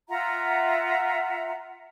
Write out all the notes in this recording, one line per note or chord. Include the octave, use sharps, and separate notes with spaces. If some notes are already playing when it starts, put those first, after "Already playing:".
F4 E5 F#5 A#5